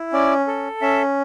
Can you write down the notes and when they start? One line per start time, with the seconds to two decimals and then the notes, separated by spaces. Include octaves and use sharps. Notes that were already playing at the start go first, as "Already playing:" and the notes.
Already playing: E4
0.13 C#4 D5
0.47 A4
0.81 C#4 E5